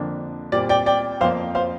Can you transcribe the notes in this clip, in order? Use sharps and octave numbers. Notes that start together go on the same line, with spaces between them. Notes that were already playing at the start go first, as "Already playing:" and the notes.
Already playing: F2 D3 F3 A#3 D4
A#2 G3 C4 D5
D5 G5
D5 G5
F2 F3 A#3 C5 F5
C5 F5